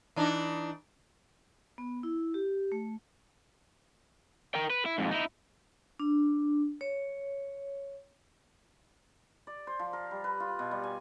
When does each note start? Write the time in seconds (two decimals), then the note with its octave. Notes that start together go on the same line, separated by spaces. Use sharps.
0.16 E3 D4 D#4
1.78 B3
2.03 E4
2.34 G4
2.72 A3
4.55 A#4 G5
4.70 B4
4.86 E4
4.98 F2 G#2
5.11 D#4 E4
6.00 D4
6.81 C#5
9.47 D5
9.67 C5
9.79 F3
9.93 A#4
10.11 G3
10.24 B4
10.40 F4
10.59 B2
10.71 G3
10.84 G#5